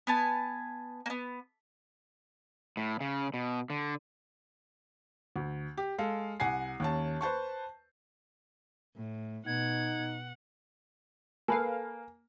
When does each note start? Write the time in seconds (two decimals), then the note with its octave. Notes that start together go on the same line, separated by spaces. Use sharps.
0.07 B3 G#5 A5
1.06 A#3 B3
2.77 A2
3.01 C#3
3.34 B2
3.70 D3
5.36 D2
5.77 G4
5.98 G#3 A4 F5
6.40 C2 F#5 G#5 C7
6.80 D#2 C#4 A5
7.21 B4 C5 A5 C#6
8.96 A2
9.47 B2 D#4 F#5 G#6
11.48 A#3 A4 B4 F5 G#5